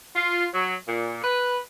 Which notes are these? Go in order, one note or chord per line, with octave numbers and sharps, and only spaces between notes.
F4
F#3
A#2
B4